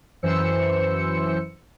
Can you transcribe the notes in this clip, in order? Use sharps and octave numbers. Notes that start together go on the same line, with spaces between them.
F#2 E3 C5 E6 C#7